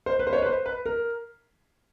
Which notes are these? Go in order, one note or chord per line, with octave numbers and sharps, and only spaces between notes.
C5
B4
C5
C#5
B4
C5
B4
A#4